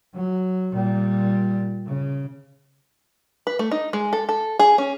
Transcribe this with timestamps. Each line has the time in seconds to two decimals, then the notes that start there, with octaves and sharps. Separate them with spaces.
0.14 F#3
0.72 A#2 G3
1.86 C#3
3.47 B4
3.59 A3
3.71 D#4
3.93 G#3
4.13 A4
4.29 A4
4.59 G#4
4.78 C#4